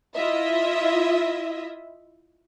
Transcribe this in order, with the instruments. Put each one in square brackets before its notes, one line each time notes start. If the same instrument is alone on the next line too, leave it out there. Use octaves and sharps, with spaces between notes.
[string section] E4 F4 D#5 E5